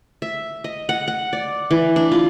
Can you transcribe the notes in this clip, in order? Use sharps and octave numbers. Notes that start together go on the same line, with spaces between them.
E5
D#5
F#5
F#5
D5
E3
D4
F4